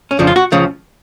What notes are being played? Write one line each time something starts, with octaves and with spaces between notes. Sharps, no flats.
C#4
F2 C#3 F3 D4
F4
F#4
C#2 C#3 F3